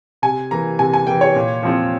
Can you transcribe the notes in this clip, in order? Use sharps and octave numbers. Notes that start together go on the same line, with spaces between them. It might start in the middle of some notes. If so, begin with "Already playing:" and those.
C3 G#5
E3 A#3 A#5
C3 G#5
G#5
E3 A#3 G5
C#5
A#2
F3 C4 F4